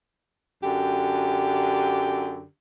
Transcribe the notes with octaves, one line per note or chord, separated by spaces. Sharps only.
F#2 D3 G4